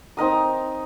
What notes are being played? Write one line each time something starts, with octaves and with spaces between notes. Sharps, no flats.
C4 D#4 A#4 D#6